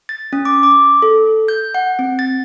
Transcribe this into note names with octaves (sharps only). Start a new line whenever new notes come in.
A6
C#4
D6
D6
A4
G6
F#5
C4
A6